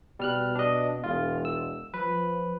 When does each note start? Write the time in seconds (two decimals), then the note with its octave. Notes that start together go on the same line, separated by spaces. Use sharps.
0.19 B2 G3 F6 F#6
0.55 D4 D#5
1.04 E1 F4
1.45 E6
1.94 F3 B4